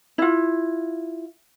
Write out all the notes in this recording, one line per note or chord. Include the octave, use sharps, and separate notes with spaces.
E4 F4